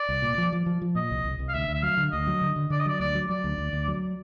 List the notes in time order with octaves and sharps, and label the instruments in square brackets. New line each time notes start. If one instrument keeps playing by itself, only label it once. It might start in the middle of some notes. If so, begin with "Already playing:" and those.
Already playing: [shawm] D5
[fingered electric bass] C2
A#2
F3
F3
F3
F3
[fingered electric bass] A#2 [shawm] D#5
[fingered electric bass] C2
C2
C2
[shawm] F5
[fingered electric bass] D2 [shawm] E5
[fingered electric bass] D2
[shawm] E5
[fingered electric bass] F#3 [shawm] F5
[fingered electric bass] D3
[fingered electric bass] D2 [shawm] D#5
[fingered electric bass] F#3
D3
D3
[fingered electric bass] D3 [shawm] D5
[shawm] D#5
[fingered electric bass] F#3 [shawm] D5
[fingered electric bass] D2 [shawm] D5
[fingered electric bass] F#3
[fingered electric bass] F#3 [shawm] D5
[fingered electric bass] D2
D2
D2
F#3